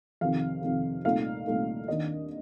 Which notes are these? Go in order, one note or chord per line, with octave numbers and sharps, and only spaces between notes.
F2 C3 D#3 F5
F2 C3 D#3
C2 A#2 A3 D#4 F5
C2 A#2 A3 D#4
D#2 D#3 A#3 D4 D#5